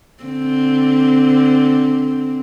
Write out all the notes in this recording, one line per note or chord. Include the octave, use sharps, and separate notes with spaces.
D3 C4